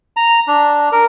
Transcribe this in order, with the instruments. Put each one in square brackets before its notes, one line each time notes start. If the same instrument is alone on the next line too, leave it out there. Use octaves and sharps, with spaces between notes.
[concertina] A#5
D4
A#4